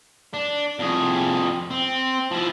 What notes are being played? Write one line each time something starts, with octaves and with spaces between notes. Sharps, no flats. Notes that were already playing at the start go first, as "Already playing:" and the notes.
D4
F2 G#4
C4
F3 E4